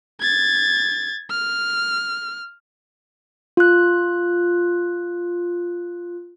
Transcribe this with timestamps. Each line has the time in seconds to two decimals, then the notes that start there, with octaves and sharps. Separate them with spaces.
0.21 G#6 A6
1.30 F6
3.57 F4 F#6